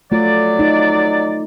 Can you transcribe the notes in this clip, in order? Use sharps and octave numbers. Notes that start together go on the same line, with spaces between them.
F#3 A3 F4 D5
D#4